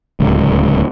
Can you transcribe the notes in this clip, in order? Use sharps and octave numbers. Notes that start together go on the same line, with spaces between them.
D1 C#2